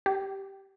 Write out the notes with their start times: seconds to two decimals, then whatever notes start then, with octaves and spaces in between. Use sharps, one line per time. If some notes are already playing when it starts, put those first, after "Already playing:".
0.06 G4